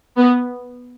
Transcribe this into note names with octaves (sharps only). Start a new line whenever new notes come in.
B3